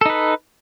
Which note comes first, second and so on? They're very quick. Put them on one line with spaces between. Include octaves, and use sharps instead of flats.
A4 D#4 B4